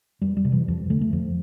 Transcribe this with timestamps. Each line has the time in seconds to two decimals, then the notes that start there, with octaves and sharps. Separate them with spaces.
0.22 F2 G3
0.37 G3
0.45 C3
0.52 E3
0.68 F2 F3
0.90 D3 A3
1.01 A3
1.13 F2 F3